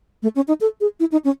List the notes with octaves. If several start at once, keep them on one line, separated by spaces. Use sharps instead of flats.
A3
C#4
D#4
A4
G#4
E4
D#4
C#4